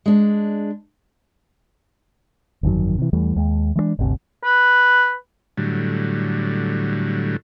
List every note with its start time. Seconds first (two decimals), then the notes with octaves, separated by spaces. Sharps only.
0.06 G#3 D4
2.63 G1 F2 D#3 F#3
2.98 C3 E3
3.13 E2 E3 G3 A3
3.36 D#2 G#3
3.76 E3 G#3 A3 D4
3.99 G1 D2 C3
4.44 B4
5.57 A2 D3 F#3 G3